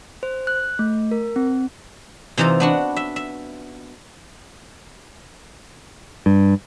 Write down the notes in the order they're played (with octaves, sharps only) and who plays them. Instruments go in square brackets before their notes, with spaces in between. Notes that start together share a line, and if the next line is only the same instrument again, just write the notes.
[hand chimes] C5
F#6
A3
A#4
C4
[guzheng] C3 E3 D#4 F4 A#5
B3 D4 F#4
E5
E5
[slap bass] G2